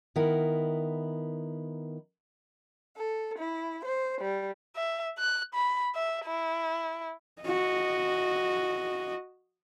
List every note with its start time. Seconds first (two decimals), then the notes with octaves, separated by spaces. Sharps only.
0.16 D#3 B3 E4 A#4
2.96 A4
3.39 E4
3.85 C5
4.22 G3
4.75 E5
5.18 F#6
5.54 B5
5.95 E5
6.25 E4
7.42 F#4 D#5